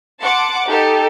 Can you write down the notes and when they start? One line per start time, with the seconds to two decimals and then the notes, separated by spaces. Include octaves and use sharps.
0.22 F#5 A5 C6 D6 C#7
0.67 D#4 G4 A4